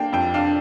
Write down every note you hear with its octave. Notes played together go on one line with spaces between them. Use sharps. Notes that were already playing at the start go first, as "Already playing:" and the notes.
Already playing: A#3 D4 F5 G5
F2 G5
D4 F5